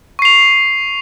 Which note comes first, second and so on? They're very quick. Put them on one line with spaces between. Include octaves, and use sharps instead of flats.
C#6 C7 F7